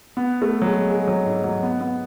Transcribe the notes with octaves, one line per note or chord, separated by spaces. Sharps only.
B3
A3
F#3
G#3
G#3
F#3
G#2
F#3
B3
B3